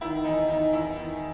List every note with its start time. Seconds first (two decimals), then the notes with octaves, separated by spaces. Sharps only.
0.01 D#3 E4
0.24 E2 D#4
0.48 D#3 D#4
0.73 E2 E4
0.95 D#3